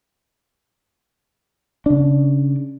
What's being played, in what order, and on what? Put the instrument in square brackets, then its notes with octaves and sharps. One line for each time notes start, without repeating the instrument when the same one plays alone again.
[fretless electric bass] C#3 D4